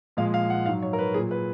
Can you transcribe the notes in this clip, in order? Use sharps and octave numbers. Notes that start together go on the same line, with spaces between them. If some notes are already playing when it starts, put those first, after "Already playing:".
A#2 F3 G#3 F5
F5
F#5
G#2 F#3 F5
C#5
A#4
B4
A#2 F#3 G#4
B4